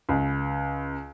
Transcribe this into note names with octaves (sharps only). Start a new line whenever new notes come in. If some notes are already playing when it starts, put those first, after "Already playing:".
C#2